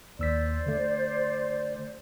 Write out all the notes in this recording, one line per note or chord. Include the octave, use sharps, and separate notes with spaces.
D#2 C5 D5 E6 B6
D3 A3